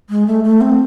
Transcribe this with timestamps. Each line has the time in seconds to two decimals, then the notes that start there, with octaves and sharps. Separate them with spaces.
0.10 G#3
0.27 A3
0.44 A3
0.61 C4